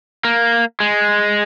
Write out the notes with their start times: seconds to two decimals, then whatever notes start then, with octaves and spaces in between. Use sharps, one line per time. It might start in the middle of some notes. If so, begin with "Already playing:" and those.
0.25 A#3
0.80 G#3